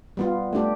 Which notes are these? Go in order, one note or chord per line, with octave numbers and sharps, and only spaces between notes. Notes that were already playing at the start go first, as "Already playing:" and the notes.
G3 B3 F4
A3 D4 G4